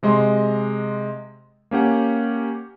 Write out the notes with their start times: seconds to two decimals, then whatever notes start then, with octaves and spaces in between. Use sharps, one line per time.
0.03 C3 G#3 D#5 C6
1.71 A#3 C#4 G4 F#5